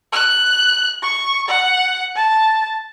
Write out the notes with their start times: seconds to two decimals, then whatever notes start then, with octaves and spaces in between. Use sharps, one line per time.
0.12 F#6
1.02 C#6
1.48 F#5
2.16 A5